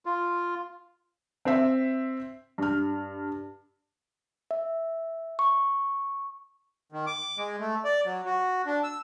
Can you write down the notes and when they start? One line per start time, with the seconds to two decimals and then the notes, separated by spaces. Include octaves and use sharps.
0.05 F4
1.45 C4 C5 E5
2.58 G2 F6
4.51 E5
5.39 C#6
6.92 D#3
7.07 D6
7.38 G#3
7.60 A3
7.85 D5
8.05 F#3
8.25 F#4
8.66 D4
8.83 E6